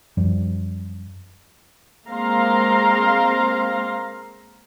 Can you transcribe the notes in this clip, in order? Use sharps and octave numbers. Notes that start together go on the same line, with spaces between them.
F#2 F3 G3
G#3 A#3 C4 F5 A#5 C6